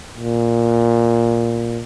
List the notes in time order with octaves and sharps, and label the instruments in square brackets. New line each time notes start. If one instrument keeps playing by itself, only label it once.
[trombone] A#2